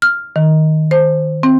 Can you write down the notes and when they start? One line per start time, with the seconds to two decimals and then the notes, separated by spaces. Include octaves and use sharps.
0.02 F6
0.36 D#3
0.91 C5
1.43 C4